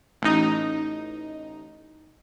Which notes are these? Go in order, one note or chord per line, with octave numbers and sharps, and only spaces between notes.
A1 D#4